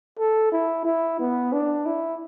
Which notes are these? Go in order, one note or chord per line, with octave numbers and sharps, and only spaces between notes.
A4
E4
E4
B3
D4
E4